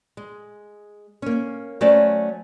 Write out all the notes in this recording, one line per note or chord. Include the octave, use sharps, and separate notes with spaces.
G#3
A#3 C#4
F#3 A3 C#4 C5 D5